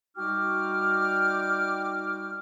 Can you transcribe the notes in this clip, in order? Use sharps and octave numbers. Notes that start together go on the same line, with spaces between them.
G3 D#4 F#4 G5 D6 F6